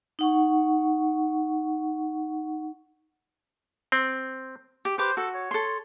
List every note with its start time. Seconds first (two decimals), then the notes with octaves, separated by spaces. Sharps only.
0.19 D#4 F#5 C#6
3.92 C4
4.85 G4
4.98 G4 B4 C5 D6
5.17 F#4 A4
5.34 C#5
5.51 A4 C6